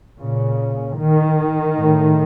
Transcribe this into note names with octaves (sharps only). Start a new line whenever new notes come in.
A#2 C#3
D#3
A2